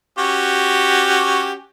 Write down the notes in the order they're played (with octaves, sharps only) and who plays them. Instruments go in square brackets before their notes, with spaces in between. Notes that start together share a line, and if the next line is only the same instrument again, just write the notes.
[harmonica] C#4 F#4 G4